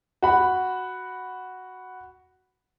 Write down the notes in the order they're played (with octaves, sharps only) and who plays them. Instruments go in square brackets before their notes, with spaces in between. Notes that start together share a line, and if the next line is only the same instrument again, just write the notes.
[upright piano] F#4 B5